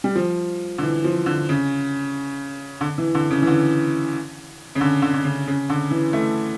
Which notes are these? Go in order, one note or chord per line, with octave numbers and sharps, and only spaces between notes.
G3
F3
D3
E3
F3
D3
C#3
D3
E3
D3
C#3
E3
D3
C#3
D3
D3
D3
C#3
C#3
D3
E3
A3